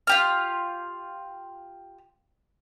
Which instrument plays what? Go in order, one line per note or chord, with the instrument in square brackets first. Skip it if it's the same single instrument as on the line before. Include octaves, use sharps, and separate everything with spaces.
[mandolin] F4 G4 F6